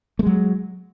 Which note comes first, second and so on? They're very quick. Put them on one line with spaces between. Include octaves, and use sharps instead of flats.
A3 G#3 F#3